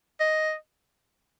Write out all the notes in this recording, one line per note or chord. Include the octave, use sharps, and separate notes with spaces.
D#5